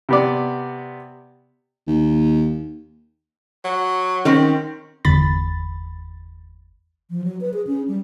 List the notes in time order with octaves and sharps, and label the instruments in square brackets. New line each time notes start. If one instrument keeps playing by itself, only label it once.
[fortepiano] C3 B3 D5
[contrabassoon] D#2
[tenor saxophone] F#3
[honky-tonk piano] D#3 [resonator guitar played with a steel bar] C4 C#4
[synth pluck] G1 E2 B5 A6
[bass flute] F3
F#3
B4
G#4
C#4
G3